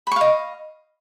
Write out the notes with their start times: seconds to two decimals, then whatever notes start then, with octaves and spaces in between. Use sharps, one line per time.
0.07 B5
0.11 C#6
0.16 F5
0.21 D#5